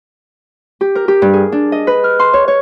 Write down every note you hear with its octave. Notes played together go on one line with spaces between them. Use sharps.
G4
A#4
G4
G2
G#4
D4
D#5
B4
F6
C6
C#5
C#5